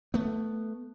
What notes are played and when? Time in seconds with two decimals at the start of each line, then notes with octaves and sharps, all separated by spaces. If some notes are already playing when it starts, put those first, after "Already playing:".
0.14 A3 B3